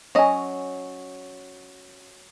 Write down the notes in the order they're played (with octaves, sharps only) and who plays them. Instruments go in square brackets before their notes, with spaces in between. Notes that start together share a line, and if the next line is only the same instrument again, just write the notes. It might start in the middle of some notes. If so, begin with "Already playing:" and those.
[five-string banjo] F#3 D#5 [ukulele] C#4 G#5